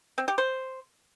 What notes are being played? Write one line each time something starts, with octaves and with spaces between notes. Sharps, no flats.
C4
G4
C5